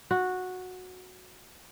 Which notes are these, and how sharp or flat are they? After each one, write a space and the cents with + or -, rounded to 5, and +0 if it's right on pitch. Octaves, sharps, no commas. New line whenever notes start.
F#4 -10